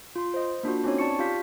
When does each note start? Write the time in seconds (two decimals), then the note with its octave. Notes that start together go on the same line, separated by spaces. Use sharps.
0.16 F4 C6
0.34 C5 D#5
0.63 A#3 D4 F4 F#4
0.84 C4 C#4 D#4 C#5
0.98 D5 A5 C#6 C#7
1.19 F4 G4 F5 G6 B6